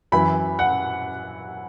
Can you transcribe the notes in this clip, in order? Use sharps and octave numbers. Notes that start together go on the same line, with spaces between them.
F#2 E3 B5
F#5